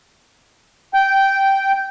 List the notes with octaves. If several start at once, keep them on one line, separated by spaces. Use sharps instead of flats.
G5